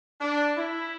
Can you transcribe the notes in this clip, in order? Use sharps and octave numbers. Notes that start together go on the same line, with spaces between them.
D4
E4